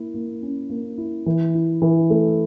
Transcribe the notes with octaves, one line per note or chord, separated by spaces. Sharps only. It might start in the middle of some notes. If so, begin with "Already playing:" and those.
Already playing: A#3 E4
A#3
C#4
A#3
E4
E3
E4
E3
A3